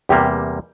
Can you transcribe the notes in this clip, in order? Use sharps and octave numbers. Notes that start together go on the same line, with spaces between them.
E2 C3 G3 A#3 G4